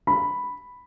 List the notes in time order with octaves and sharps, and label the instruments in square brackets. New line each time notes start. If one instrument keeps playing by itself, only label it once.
[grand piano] B5